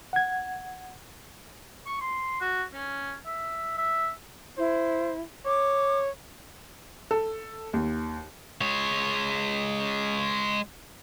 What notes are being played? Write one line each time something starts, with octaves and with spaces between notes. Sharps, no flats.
F#5 G#6
C#6
C6
F#4
C#4
E5
E5
E4 C5
C#5 D6
A4
D#2
G#3 C#5